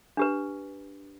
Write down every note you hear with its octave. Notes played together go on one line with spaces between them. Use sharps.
D4 G4 B4